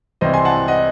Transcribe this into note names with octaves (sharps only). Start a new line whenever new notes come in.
C2 C3 E3 C5 D#5
G#5 C6
F#5 A5
D#5 F#5